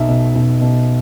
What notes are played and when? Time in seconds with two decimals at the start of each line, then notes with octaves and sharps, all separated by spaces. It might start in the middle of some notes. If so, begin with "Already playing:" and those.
Already playing: B1 E5
0.08 B2
0.35 B1
0.61 B2